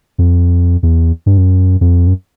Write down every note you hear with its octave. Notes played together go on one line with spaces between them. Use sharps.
F2
E2
G2
F#2
F2
F#2